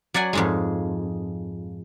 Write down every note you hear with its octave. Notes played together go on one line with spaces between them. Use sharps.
F#3 D5 F#5 G#5
F2 G#2 G#3